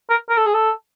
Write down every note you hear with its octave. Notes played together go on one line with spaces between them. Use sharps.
A#4
A#4
A4
G#4
A4